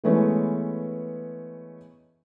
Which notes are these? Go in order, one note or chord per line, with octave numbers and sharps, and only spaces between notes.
E3 G#3 A3 B3 C#4